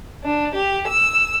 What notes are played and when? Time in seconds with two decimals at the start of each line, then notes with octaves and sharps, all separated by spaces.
0.25 D4
0.55 G4
0.88 E6